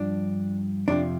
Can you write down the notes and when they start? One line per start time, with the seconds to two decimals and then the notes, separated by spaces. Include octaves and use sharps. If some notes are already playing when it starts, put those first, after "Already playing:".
Already playing: G2 F3 D4
0.88 F2 C3 F3 D4